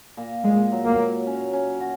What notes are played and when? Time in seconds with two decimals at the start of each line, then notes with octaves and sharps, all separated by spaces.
0.17 A#2
0.44 A#2 G#3
0.72 F#3
0.85 A#3
0.99 F#3
1.27 C#4
1.53 C#4
1.80 F#4